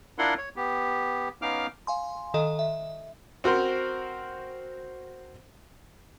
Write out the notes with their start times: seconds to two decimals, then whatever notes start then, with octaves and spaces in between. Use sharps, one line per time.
0.18 D4 E4 F4 A#4 F#5 C6
0.38 C#5
0.56 B3 G4
1.42 B3 C#4 D#4 F5 D6 F6
1.87 F5 G#5 C6
2.34 D#3 A4 D#5
2.59 E5
3.44 C4 F#4 A#4 C5